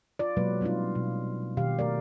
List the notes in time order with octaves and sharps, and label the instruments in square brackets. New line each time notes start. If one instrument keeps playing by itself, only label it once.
[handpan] F4 D5
B2 F#3 G#3 A#3 B4
G3 C4 D4 D#4 F4
B2
B2 D#3 G4 F5
A3 A#4 D5